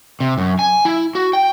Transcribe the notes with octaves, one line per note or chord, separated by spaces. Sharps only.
C3
F#2
G#5
E4
F#4
G5